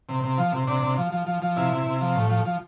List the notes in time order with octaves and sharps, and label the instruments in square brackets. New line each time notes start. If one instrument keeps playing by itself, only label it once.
[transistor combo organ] C3
C3
F3
C3
C3 D4
C3
F3
F3
F3
F3
C3 E4
C3
C3
F3
A2
F3
F3